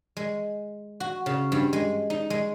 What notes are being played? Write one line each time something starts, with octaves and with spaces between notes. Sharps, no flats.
G#3
F#4
C#3
G2
G#3
D#4
G#3